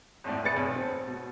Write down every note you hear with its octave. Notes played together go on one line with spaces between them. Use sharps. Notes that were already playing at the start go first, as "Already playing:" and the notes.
G#1 F2 A2 A3 D5
D#1 A3 G#4 B4 A6 C#7
B1 F2
C4
B2